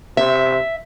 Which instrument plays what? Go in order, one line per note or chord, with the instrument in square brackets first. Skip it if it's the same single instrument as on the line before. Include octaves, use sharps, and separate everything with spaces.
[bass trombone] C3 [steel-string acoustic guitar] E5